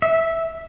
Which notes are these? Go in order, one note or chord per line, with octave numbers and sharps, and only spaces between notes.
E5